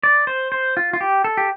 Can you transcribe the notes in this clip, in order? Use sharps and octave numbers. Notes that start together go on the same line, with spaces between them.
D5
C5
C5
F4
F4
G4
A4
G4